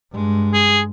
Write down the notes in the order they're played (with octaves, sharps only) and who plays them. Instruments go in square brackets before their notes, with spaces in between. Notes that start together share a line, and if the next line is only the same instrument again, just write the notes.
[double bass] G2 G#3
[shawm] G#4